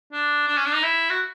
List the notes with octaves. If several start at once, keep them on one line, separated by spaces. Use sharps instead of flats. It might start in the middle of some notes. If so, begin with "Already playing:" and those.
D4
D4
C#4
D4
D#4
E4
F#4